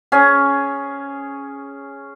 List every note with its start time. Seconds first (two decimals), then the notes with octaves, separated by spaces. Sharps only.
0.12 C#4 G#4